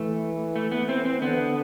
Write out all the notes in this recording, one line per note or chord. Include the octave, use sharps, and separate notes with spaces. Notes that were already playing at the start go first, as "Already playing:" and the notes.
Already playing: E3 A3
A3
B3
C4
C4
D3 B3